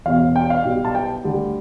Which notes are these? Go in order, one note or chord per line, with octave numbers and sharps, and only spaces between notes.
E1 E2 B2 F5
G5
F5
B1 B2 G3
A5
G5
D2 D3 G3